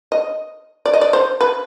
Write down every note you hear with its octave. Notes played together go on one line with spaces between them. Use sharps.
D#5
D5
D#5
D5
C5
B4